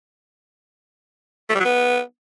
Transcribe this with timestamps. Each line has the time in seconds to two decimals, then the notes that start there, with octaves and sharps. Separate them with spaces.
1.50 A3
1.55 G3
1.60 F#3
1.65 B3